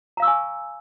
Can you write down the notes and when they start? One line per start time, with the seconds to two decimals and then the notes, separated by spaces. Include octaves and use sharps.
0.17 A#5
0.20 F5
0.22 E6
0.25 C#6
0.27 G#5